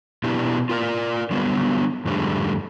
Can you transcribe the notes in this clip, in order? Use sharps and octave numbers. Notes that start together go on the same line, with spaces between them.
B2 B3 D4 E4 G4
F4 A#4 D5
D3 F#3 G3 B3
F2 G#2 D3 G3 A3